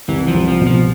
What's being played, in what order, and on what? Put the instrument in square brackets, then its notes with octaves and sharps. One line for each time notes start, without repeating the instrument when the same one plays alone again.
[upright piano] C2 [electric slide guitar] E3
[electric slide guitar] F3
[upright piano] C2
[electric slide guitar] F3
[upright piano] B2
[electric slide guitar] F3